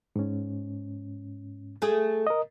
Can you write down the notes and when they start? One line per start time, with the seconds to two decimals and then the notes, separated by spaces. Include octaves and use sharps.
0.16 G#2 C#4
1.82 A3 G#4
2.27 A#4 D#5